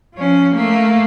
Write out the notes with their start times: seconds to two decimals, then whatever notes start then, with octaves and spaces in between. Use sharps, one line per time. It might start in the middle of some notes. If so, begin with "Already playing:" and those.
0.14 F3 C#4
0.54 A3 A#3